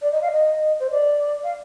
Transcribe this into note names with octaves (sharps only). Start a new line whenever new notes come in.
D5
D#5
F5
D#5
C5
D5
F5